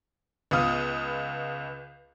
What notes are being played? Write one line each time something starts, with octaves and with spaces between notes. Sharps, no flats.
C#2 B3 F4 D#6 F6